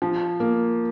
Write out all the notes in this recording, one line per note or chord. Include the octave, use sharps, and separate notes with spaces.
F3
A#3